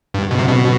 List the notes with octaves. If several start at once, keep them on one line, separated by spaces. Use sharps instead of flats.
G2 D3 F#3 C4 F#4
B2
C3
B2